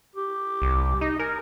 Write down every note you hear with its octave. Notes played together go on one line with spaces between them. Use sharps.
G4
C2
D#4 D#5
A#4 G#5